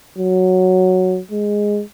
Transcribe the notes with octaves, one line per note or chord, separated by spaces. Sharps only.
F#3
G#3